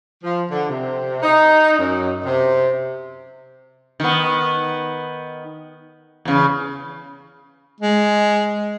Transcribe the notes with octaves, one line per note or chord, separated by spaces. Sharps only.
F3
D3
C3
D#4
F#2
C3
D#3 B3
E2 C#3
G#3